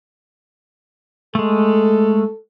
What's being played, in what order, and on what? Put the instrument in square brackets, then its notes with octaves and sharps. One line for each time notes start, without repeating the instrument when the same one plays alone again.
[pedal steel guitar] G#3 A3 [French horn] A4